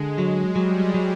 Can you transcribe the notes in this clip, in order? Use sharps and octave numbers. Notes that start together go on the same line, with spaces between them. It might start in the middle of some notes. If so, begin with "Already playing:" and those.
Already playing: D3 G#3
F#3
F#3 G3
F#3